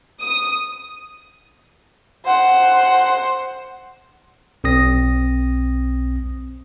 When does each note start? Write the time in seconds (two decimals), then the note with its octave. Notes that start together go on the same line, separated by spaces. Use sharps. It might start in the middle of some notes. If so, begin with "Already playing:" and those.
0.22 D#6
2.25 C5 F#5
4.64 B1 C4 D#6 A#6